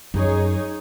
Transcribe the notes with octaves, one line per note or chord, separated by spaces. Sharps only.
F#2 D#4 G#4 C#5